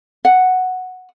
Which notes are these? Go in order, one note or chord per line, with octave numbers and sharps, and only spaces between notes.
F#5